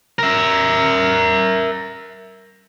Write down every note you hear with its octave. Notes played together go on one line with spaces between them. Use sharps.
A#4 E5